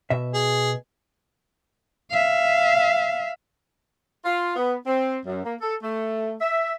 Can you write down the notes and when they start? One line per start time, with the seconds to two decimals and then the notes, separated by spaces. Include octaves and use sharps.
0.10 B2 E5
0.34 G#4
2.11 E5 F5
4.25 F4
4.56 B3
4.86 C4
5.25 F#2
5.44 A#3
5.61 A4
5.82 A3
6.41 E5